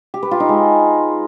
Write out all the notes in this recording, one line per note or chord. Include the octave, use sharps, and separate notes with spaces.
G4
B4
F4
D#4
G#3